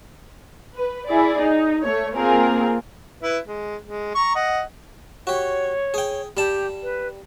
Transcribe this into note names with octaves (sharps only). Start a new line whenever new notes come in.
B4
E4 G#4 D5
D#4
A3 C#5
A#3 C4 F4 G#4 A#4
E4 B4
G#3
G#3
A#5 C#6
D#5 F#5
F#4 G4 C#5
G#4 G5
G3 G4 A5
B4